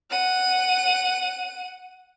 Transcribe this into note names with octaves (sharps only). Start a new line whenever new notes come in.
F#5 D#7